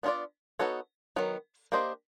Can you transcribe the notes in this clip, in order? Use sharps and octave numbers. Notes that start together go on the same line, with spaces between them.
B3 D4 F4 A#4 D5
B3 D#4 F#4 A4 C#5
D#3 F#3 B3
A#3 D4 G4 C5 D#5